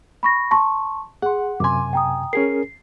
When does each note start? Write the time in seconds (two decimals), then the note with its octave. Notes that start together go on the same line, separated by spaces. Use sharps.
0.23 B5 C#6 A#6
0.51 A5 C6 C#6
1.22 G#4 F#5 C6
1.60 F#2 C3 G#5 C6 D6
1.93 G5 A#5 D#6
2.33 C#4 G#4 A#4 C7